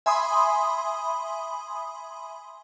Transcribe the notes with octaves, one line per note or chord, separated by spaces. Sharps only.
E5 G#5 B5 C6 D#6